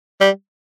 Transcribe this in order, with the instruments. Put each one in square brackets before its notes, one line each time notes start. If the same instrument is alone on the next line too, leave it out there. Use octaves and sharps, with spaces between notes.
[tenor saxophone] G3